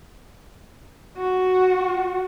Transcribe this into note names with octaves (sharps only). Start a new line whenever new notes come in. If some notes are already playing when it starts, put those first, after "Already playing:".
F#4